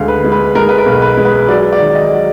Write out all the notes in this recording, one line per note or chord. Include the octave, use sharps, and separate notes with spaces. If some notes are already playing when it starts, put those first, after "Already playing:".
Already playing: D2 G#3 F5
B4
G#3
B4
G#3 A#4
B4
A#4
B1
B4
G#3
B4
F#3 D5
D5
D#3
D#5
F#3